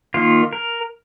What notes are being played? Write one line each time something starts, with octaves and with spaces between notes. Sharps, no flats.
D#3 A#3 F4
A#4